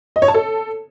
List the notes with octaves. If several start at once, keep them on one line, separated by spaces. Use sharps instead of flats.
D#5
C#5
A5
A4